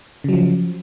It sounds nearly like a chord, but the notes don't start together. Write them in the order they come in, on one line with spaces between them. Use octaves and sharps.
C#3 F#3 F3